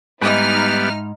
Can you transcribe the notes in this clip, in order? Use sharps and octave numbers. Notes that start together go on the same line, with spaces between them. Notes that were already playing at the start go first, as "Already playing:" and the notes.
G#2 G3 B3 D#4 E4 F6